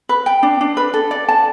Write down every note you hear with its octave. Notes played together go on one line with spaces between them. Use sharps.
B4
G5
D4
D4
B4
A4
D5
A5